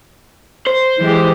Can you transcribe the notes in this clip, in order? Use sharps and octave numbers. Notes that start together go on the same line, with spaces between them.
C5
E3 G#3 G4